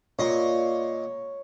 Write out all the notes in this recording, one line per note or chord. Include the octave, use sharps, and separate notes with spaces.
A#2 C#5 D#5 C#6